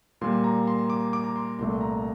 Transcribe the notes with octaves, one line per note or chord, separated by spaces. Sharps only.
A#2 G3 A#3 C6
A#5
C6
D6
D6
A#5
C6
C2 A#2 A3 C6
A#5